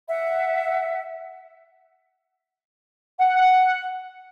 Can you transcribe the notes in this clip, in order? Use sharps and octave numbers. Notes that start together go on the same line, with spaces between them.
E5 F#5
F#5